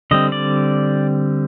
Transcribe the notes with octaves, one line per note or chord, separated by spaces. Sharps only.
D3 G3 C4 D#5
D5